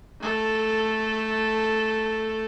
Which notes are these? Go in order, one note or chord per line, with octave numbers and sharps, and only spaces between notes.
A3 A4